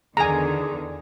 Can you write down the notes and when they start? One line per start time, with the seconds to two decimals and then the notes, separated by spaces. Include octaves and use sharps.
0.17 E2 D3 D#3 G#4 G#5 A#5